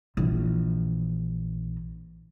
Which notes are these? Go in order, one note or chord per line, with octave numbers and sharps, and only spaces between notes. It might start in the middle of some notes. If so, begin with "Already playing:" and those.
A#1 E3